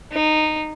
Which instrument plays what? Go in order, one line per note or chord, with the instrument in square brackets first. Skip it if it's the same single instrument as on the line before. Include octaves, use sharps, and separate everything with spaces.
[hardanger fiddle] D#4